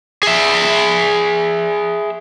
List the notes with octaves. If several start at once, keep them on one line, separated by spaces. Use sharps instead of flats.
G#4 E5